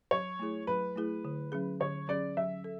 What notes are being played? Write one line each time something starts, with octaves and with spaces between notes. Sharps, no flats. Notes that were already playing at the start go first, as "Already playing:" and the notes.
F#3 C#5
A3 E4 G#4
F#3 B4
A3 E4 G#4
D3
F#3 C#4 G#4
D3 C#5
F#3 C#4 G#4 D5
F#3 E5
A4